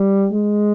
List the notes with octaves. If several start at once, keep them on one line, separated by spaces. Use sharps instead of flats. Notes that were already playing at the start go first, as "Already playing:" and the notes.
Already playing: G3
G#3